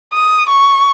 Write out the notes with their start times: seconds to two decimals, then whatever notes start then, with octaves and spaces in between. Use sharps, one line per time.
0.13 D#6
0.49 C#6